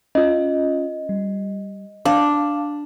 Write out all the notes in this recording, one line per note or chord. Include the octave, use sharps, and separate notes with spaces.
C#4 F4 D#5
G3
D4 F5 A5